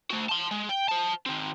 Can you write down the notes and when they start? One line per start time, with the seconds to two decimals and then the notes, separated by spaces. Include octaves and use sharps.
0.11 A3 F#4
0.29 A5 C6
0.51 G#3
0.69 G5
0.89 C5 A5
1.26 D#3 C4